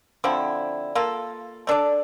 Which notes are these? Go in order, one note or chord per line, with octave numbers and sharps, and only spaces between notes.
D3 F3 C4 E4
A#3 F4 A4
A3 D4 A4 D5